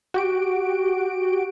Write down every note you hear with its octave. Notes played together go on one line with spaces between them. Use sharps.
F#4 G4 D7